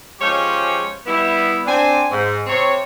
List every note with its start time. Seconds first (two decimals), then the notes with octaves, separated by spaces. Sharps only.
0.20 F3 G#3 C#4 G4 C5 C#5
1.06 G3 B3 E4
1.66 C4 D4 G#5
2.11 G#2
2.47 C3 C4 C#5